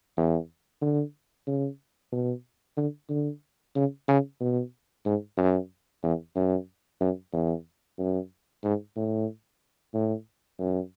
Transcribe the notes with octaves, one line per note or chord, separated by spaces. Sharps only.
E2
D3
C#3
B2
D3
D3
C#3
C#3
B2
G#2
F#2
E2
F#2
F#2
E2
F#2
G#2
A2
A2
F#2